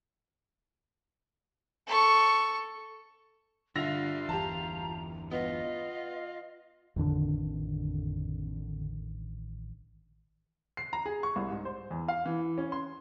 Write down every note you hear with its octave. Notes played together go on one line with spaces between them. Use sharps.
A4 C#6
G2 D3 F4 E5 A#6 F7
G1 E2 E3 G4 A5 A#5
B3 F4 D#5
A1 F2 D3 D#3 D4
C7
A#5
G#4
C#6
C2
G#2
C5
E2
F5
E3
C#4
C6